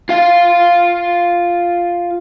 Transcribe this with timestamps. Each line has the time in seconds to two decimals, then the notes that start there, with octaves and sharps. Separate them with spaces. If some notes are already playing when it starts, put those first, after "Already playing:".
0.09 F4 F5